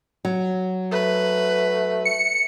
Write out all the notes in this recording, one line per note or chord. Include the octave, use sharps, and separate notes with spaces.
F#3
A3 B4
C#7